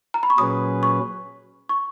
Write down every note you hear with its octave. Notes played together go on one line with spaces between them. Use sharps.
A#5
B5
C#6
A#2 F#3 C#4 G#4 B4 D#6
C#6
C#6